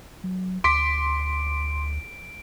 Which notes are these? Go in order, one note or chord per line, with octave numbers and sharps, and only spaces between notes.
F#3
D2 C6 D6 B6 D7